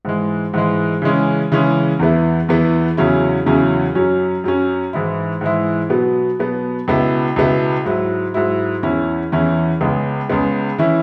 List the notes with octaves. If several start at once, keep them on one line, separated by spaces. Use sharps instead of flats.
G#2 E3 G#3
G#2 E3 G#3
C#3 E3 G#3 C#4
C#3 E3 G#3 C#4
E2 E3 B3 E4
E2 E3 B3 E4
E2 C#3 F#3 C#4 E4
E2 C#3 F#3 C#4 E4
F#2 F#3 C#4
F#2 F#3 C#4
G#2 E3 G#3 E4
G#2 E3 G#3 E4
B2 F#3 B3
B2 F#3 B3
C#2 B2 B3 E4
C#2 B2 B3 E4
G#2 F#3 E4
G#2 F#3 E4
E2 E3 C#4 E4
E2 E3 C#4 E4
C#2 C#3 G#3 B3
C#2 C#3 G#3 B3
E3 C#4 E4